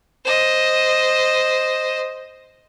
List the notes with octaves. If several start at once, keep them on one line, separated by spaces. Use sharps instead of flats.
C5 D#5